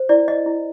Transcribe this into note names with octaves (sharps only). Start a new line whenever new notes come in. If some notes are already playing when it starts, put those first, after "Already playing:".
Already playing: C5
E4 D5
D#5
E4